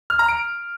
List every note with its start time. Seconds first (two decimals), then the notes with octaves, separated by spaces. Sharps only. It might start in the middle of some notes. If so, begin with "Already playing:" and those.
0.10 F6
0.19 A#5
0.29 D7